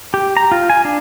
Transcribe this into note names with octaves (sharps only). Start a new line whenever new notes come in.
G4
A#5
F4
G#5
D4